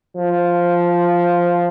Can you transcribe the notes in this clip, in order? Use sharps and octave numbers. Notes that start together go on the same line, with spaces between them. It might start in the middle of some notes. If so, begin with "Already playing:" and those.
F3